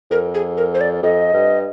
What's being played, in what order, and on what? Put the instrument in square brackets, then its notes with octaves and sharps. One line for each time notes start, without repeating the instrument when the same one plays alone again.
[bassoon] F2 [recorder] A#4
[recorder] G#4
A#4
C5
D5
[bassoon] F2 [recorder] D#5
[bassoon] G2